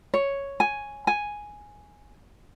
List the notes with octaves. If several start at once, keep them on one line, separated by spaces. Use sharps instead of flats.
C#5
G#5
G#5